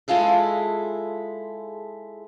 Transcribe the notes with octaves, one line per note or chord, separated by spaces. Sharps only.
G#3 E4 F4 G#4 A4